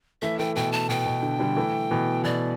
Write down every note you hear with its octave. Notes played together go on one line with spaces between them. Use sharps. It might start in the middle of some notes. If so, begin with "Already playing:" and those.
E3 A3 E5
E3 A3 G5
B2 E3 G5
A5
B2 G5
B2
D3
D3 G3
E3 A3
B2 E3
B2 E3 D5